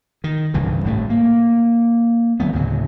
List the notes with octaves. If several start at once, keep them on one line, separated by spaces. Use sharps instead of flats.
D#3
C2 G2 C#3 E3
G#1 A2 A3
A#3
D3 F#3 A3 B3
D2 A2 C#3 F#3